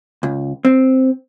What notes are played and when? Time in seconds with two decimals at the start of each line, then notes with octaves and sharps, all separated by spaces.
0.23 C#2
0.65 C4